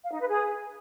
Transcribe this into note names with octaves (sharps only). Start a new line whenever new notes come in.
F5
D#4
B4
G#4